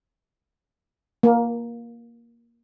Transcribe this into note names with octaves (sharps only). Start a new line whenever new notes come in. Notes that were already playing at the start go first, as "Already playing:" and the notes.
A#3